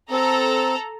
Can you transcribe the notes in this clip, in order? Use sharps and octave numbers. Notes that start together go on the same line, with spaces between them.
C4 A4 A#5